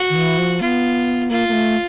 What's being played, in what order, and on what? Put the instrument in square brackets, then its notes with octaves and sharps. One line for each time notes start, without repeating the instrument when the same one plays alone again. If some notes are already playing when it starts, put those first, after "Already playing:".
Already playing: [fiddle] F#4
[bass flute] D#3
E3
F3
[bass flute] B3 [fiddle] F4
[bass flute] A#3 [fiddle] F4
[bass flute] A#3
A3